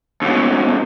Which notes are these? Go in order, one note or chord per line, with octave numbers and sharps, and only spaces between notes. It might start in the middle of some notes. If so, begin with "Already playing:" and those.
D#2 B2